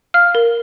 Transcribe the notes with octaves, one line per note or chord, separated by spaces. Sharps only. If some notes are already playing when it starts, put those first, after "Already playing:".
F5 F6
A#4